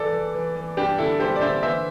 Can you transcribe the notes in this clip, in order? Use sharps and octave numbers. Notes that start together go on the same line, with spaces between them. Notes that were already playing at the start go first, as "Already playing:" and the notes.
Already playing: E3 A4 D5
E3
E3
E3
G2 D4 G4
D3 E4 A4
G2 G4 C5
D5
D3 C5 E5
E3 C5 E5